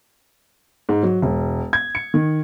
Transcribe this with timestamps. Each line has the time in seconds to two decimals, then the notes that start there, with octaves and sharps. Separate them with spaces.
0.89 G#2
1.03 F#3
1.22 E1
1.73 G#6
1.95 C#7
2.14 D#3